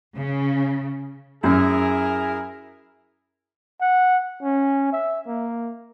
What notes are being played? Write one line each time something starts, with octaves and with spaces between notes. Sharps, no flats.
C#3
F#2 E4 G#4 A#4
F#5
C#4
E5
A#3